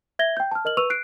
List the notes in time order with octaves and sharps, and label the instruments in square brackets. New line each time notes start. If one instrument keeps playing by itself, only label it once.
[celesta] E5 G#6 A#6 G7
G5 G6
A5 F6
A#4 D#5 F6 F#7
B4 C#6 E6 D#7 F7
F#6 C7 D7